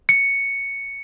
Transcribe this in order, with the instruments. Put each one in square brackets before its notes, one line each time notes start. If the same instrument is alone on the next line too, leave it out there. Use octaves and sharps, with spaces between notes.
[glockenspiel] C#7